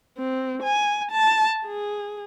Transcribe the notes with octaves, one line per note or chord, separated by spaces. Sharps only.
C4
G#5
A5
G#4